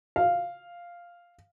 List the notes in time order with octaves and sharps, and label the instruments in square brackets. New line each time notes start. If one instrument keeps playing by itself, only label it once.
[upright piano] F5